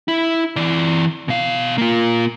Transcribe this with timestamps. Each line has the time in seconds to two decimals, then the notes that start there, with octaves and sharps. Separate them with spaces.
0.08 E4
0.56 E3 D5
1.28 B2 F5
1.78 A#3 F4